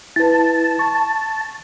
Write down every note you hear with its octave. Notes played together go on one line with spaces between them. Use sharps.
E4 B4 A5
C#6